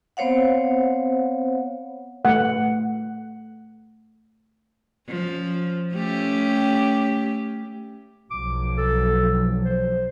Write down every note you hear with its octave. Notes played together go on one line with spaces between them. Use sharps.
B3 C4 C5 C#5 F5 F#5
A3 F#5
F3 C#4
A3 C#4 G4
B1 F3 F#3 D6
A4
C5